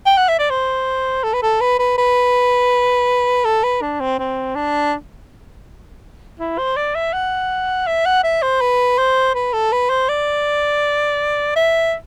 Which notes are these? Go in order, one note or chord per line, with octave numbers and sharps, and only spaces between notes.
G5
F#5
E5
D5
C5
A4
B4
A4
B4
B4
B4
A4
B4
D4
C4
C4
D4
E4
C5
D5
E5
F#5
E5
F#5
E5
C5
B4
C5
B4
A4
B4
C5
D5
E5